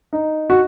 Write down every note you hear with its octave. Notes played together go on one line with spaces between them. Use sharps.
D#4
F#4